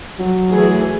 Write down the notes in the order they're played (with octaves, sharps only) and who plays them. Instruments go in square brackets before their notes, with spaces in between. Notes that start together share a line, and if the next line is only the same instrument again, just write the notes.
[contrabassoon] F#3
[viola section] E3 A3 G#4